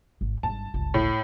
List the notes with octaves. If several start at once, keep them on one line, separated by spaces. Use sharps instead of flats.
G#1
G#1 G2 A5
G1 C#2
A2